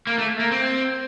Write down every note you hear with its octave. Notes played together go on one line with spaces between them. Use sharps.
A#3
A3
A#3
C4